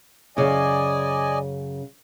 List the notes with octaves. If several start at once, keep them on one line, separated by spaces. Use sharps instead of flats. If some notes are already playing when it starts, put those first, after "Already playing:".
F#2 C#3 D5 D#5 G#5